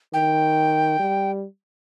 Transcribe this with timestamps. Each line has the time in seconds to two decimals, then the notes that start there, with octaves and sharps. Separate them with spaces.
0.13 D#3 G5
0.99 G3